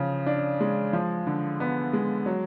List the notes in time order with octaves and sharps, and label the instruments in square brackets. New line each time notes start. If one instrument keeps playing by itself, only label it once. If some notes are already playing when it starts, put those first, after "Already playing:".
Already playing: [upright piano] C#3 F3
D4
G#3
F3
D3
B3
G#3
F#3